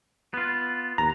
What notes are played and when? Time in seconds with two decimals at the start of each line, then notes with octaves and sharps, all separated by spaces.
0.34 B3 F4
0.98 D#2 A#5